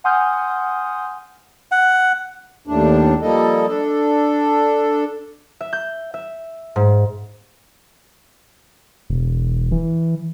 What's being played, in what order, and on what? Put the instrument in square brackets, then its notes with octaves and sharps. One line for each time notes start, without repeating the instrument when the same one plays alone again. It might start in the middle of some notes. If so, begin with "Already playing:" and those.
[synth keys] F#5 G#5 C6 D#6 F6 G6
[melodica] F#5
[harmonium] D#2 A2 D4
F3 G3 A#3 A4 D#5
D4 A4
[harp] E5
G6
E5
G#2
[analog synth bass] E1
E3